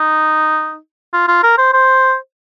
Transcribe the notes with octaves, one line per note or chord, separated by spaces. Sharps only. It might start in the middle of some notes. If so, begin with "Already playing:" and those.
Already playing: D#4
F4
F4
A#4
C5
C5